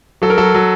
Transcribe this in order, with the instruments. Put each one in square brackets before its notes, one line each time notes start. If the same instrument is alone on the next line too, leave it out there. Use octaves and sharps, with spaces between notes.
[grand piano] F#3 A4
A#4
F#3 A4
F#3